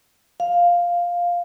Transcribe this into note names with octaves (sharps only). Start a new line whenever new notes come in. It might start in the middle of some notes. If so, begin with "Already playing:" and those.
F5